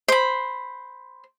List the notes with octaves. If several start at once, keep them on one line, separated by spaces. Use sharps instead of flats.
C5 B5